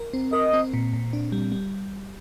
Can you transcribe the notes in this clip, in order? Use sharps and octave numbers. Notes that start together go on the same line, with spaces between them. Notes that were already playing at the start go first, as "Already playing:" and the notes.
Already playing: A#4
C4
A#4 D#5
C4
A#2
A#2
D4
G3
G3